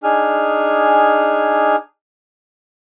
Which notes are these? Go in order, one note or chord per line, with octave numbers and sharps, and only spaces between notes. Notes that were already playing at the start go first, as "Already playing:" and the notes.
D4 D#4 G#4 G#5 F6